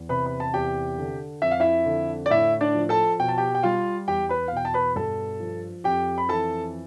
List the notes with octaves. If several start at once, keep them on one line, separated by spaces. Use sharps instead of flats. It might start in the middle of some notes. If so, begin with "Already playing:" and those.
Already playing: E2
C3 B4 B5
B5
A5
E2 G4 G5
D3
F2 E5
F5
E4 E5
D3
D5
A2 E4 E5
D4 D5
F3
A4 A5
B2 G5
A5
G4 G5
G5
G3 F4 F5
E2 G4 G5
B4 B5
F5
B2 G5
A5
B4 B5
G2 A4 A5
F3
F2 G4 G5
B5
E3 A4 A5